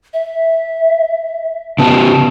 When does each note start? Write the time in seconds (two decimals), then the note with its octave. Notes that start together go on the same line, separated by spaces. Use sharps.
0.13 E5
1.79 C#3 B3 A5